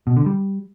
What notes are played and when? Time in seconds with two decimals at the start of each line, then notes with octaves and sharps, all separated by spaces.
0.07 B2
0.17 D3
0.26 G3